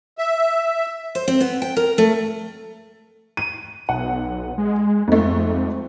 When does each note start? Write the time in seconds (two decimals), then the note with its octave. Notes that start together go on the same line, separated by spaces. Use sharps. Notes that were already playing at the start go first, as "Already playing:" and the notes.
0.18 E5
1.15 C5
1.28 C4
1.41 B3
1.62 G5
1.77 A#4
1.98 A3
3.37 D#7
3.89 B1 F#5
4.58 G#3
5.08 F2 G#2 A3